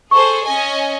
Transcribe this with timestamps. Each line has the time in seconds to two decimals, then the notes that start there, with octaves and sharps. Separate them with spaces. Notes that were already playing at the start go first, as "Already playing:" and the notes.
0.11 G#4 A4 C5 C#6
0.46 C#4 D#5 G#5